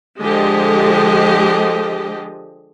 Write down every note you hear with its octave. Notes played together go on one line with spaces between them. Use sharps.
D3 F3 G#3 G4 D#5